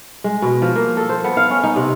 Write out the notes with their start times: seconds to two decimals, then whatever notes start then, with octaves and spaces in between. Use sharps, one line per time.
0.24 G#3
0.42 B2
0.62 F3
0.76 A#3
0.97 A4
1.09 C5
1.24 B3
1.37 F5
1.50 C#4
1.64 D#4
1.76 C3